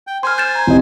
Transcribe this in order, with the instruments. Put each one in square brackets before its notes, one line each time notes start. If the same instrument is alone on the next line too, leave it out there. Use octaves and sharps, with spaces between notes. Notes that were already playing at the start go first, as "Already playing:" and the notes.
[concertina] G5
[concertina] C5 G#5 [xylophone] C6 F6
[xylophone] G6 A6 E7
A#5 G#6
[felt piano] C2 D#5